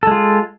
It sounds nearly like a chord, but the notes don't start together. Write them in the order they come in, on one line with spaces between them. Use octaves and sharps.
A4 G#3 F4